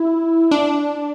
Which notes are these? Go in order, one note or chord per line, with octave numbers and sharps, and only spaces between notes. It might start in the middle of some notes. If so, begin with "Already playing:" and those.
Already playing: E4
D4